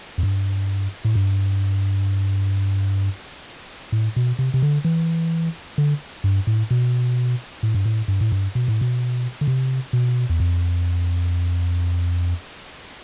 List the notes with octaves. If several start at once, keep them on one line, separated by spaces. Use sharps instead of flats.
F2
G2
A2
G2
A2
B2
C3
C3
D3
E3
D3
G2
A2
B2
A2
G2
A2
G2
A2
G2
B2
A2
B2
D3
C3
B2
E2
F2